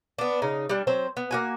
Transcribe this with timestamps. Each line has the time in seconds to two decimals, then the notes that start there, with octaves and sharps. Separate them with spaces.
0.18 B3 D4
0.42 C#3 D#4
0.69 G3 D4
0.87 F#3 C4 C5
1.17 B3
1.31 A#3 F#4 G#5